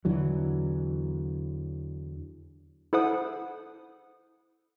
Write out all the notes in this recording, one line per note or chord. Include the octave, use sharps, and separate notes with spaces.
E2 D3 E3 F#3
E4 A4 C5 F#5 D#6